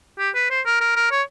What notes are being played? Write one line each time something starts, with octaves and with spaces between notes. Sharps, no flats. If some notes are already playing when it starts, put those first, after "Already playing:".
G4
B4
C5
A#4
A#4
A#4
C#5